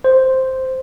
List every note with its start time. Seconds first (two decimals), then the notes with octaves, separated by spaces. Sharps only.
0.04 C5